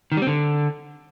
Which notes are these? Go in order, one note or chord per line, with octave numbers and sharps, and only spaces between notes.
D#3
G3
C4
D3